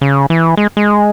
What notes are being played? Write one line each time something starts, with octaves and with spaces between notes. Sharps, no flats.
C#3
E3
G#3
G#3